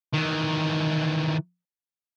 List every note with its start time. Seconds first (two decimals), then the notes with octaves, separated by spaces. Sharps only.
0.14 D#3 E3